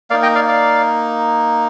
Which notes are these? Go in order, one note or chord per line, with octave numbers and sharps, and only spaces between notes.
A#3 D#4 D5 F5
D#5 G5
D5 F5
D5 F5